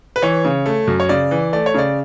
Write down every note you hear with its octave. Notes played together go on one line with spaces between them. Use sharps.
B4
E3 C#5
C#3
A3
F#2
C#5
C#3 D5
E3
A3 D5
C#5
C#3 D5